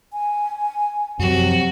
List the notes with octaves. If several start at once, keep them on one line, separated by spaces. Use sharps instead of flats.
G#5
F#2 C3 F3 F#3 F#4